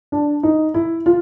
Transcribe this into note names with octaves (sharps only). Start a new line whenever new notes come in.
D4
D#4
E4
F4